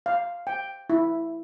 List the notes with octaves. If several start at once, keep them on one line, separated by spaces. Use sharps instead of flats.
F5
G5
E4